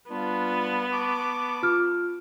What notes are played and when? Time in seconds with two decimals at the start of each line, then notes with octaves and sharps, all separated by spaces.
0.10 G3 B3 D4 F4
0.91 A5 C#6 D6
1.63 F4 F6